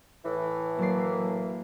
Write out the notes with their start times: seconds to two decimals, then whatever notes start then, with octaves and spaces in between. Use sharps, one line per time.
0.24 A2 E3
0.79 F#3 A#3 D5 C7